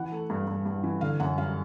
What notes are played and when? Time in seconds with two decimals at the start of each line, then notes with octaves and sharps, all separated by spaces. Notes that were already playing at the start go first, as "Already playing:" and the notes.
Already playing: E3 F#5
0.12 A3
0.30 G2
0.47 G2
0.66 G2
0.83 E3
1.01 D3 F5
1.20 F#2 F#5
1.38 G3 F5